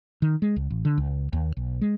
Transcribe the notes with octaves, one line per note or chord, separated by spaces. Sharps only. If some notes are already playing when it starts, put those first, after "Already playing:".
D#3
G#3
C#2
A1
D3
C#2
D#2
B1
G#3